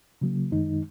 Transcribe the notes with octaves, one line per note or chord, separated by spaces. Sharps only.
C#3 F#3 A#3
F#2 D#3 G#3 D#4